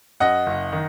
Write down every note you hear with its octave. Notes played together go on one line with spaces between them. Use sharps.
F#2 D#5 F#5
F#1
D#3